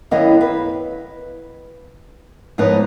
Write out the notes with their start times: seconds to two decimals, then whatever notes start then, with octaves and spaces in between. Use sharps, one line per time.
0.11 F#2 D#3 B3 E4 D#5 F5
0.41 B4
2.58 G#2 F3 B3 D#4 B4 C#5